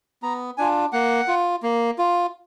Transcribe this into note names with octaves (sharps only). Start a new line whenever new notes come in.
B3 A#5
D4 F4 G#5
A#3 F#5
F4
A#3
F4